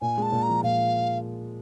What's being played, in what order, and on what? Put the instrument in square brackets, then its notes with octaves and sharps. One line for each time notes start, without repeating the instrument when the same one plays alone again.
[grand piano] A#2 [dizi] G#5
[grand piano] G#3 [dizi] A5
[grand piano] A#2
[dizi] A#5
[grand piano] F3
[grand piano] A#2 [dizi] F5